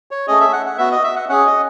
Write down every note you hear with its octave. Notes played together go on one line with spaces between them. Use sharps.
C#5
A3 C#4 G#4 D#5
E5
F#5
F#5
B3 F#4 E5
D#5
E5
F#5
C#4 G#4 F#5
D#5